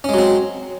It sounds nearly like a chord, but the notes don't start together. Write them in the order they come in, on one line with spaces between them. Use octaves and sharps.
C#4 G#3 F#3 C4